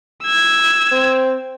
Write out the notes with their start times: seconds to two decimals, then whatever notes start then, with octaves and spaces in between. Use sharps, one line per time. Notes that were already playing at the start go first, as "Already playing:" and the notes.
0.23 E6 G#6
0.92 C4